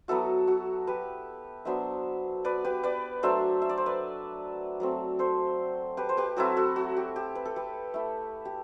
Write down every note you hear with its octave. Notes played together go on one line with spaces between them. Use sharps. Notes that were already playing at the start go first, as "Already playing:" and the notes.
F#3 B3 E4 F#4 A4
F#4
G4 B4
F#3 B3 D4 C5 E5
B4 D5
G4 B4
B4 D5
F#3 A3 D4 C5 E5
E5
D5
C5
B4 D5
F#3 A3 C4
A4 C5
G4 B4
C5
G4 B4
F#3 C4 E4 F#4 A4
F#4 A4
F#4
G4
G4
B4
A4
G4 B4
A3 E4
G4